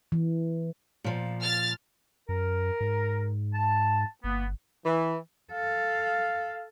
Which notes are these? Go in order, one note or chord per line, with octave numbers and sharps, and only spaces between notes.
E3
A#2 F3
F6 A6
F#2 A#4
G#2
A5
G1 A#3 B3
E3
A4 F5